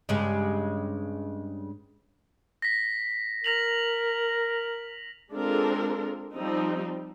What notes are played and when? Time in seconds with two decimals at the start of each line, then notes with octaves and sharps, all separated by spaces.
0.09 G2 C#3 G#3
2.62 A#6 B6
3.44 A#4 A#6 F7 F#7
5.32 G#3 C4 D4 F4 A4 A#4
6.34 F3 G3 C4 D#4